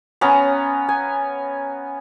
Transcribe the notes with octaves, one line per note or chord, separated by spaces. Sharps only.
B3 C#4 F5 A#5
G#5